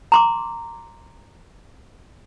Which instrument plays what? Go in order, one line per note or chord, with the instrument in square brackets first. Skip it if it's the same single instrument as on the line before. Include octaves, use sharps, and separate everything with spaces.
[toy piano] A#5 C6 D6